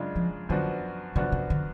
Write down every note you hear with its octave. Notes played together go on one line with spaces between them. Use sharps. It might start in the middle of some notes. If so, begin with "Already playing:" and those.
Already playing: F#2 C#3 G#3 D4 F4
F3
F#2 D3 F3 B3 D4 F#4
F#2 C#3 F3 B3 D4 F#4
C#3
D3